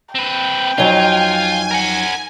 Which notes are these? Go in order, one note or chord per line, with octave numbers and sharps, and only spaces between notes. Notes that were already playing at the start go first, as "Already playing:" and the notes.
C4 B4 G5
F2 F#3 D#4 F4 G#5
A#4 F#5